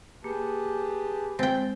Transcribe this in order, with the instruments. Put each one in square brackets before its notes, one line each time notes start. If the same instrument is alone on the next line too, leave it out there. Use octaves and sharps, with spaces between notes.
[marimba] A#3 [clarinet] G4 [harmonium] G#4 B4 A5
[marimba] G#3 A6 [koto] C4 G5